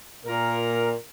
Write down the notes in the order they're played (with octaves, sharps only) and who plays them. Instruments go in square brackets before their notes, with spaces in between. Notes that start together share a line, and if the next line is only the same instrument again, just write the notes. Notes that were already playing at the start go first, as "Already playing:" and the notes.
[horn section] A#2 A#4